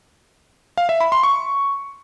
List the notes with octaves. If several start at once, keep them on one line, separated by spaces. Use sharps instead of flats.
F5
E5
B5
C6
C#6